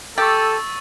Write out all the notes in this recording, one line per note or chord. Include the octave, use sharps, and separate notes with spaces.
G4 A4 C#6 E6 A6